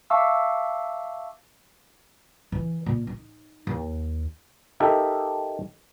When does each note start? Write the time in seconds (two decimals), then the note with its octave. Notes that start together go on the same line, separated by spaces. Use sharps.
0.10 E5 F5 A5 C#6 D6 E6
2.52 E3
2.86 A#2
3.07 D#4
3.67 D#2
4.80 D#4 G4 A4 A#4 E5